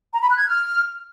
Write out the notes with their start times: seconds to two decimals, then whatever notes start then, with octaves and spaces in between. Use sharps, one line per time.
0.11 A#5
0.20 B5
0.29 F#6
0.38 G#6
0.46 F6